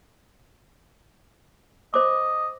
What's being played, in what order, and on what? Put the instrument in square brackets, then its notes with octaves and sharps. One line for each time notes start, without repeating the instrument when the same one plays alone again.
[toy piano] C5 D6 [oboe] D#5